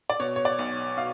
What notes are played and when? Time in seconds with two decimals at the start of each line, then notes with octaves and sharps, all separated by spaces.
0.10 D5
0.20 B2 C#5
0.36 C#5
0.45 D5
0.59 B1
0.97 B2 F5